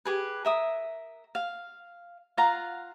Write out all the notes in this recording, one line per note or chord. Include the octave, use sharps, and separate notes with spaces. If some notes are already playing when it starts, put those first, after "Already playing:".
G4 G#4 B4
A#4 E5 D#6
F5
F4 F5 F#5 A#5